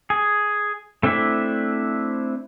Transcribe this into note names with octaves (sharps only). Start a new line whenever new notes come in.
G#4
A3 C4 D4 E4 E5